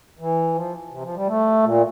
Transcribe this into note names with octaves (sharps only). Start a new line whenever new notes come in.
E3
F3
C3
F3
G3
A3
A#2